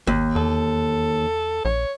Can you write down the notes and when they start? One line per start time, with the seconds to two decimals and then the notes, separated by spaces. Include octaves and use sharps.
0.07 G#1 D#2
0.36 E2 A4
1.65 A#1 C#5